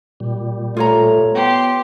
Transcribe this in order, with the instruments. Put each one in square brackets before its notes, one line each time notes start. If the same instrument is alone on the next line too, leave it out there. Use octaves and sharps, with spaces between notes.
[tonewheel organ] A#2 G3
[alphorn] A3 [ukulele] F4 C#5 A#5
[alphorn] B3 [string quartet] G4 C6